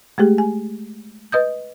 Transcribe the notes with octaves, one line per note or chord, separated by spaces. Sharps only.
G#3 A3 G4 G#4
G#5
B4 D#5 D#6 G6